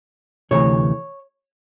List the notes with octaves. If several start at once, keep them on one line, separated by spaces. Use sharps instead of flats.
D2 C3 E3 A3 C#5